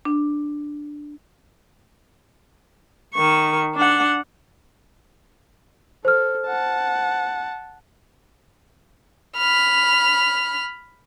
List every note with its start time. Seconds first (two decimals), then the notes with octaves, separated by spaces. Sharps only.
0.05 D4
3.14 D#3 C#6
3.75 D4 F#5
6.05 A4 C5 F6
6.47 F#5 A5
9.38 B5 F6